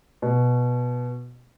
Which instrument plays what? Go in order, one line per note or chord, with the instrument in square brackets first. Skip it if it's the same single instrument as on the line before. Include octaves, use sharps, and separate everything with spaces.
[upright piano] B2